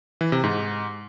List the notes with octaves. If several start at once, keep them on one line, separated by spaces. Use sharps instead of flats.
E3
C3
G#2